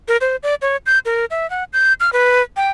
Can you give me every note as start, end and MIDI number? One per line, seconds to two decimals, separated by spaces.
0.08 0.17 70
0.21 0.36 72
0.43 0.55 74
0.62 0.77 73
0.86 0.99 91
1.05 1.25 70
1.31 1.49 76
1.50 1.64 78
1.73 1.93 91
2.00 2.10 89
2.13 2.42 71
2.57 2.71 79